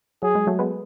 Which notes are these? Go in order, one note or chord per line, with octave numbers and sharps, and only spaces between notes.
F#3 G#4
G#3
F#3 A3
G#3 B3